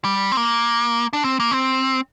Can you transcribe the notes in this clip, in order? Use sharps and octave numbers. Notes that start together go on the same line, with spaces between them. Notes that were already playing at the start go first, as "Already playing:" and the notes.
G3
C4
A#3
D4
C4
A#3
C4